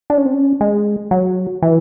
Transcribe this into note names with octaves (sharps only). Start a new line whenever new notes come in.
D4
C#4
C4
C#4
G#3
F#3
E3